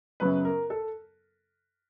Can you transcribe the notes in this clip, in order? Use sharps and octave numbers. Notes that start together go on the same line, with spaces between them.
F#2 C#3 F#3 B3 B4
A#4
A4